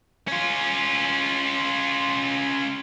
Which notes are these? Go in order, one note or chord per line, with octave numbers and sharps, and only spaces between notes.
C#4 F4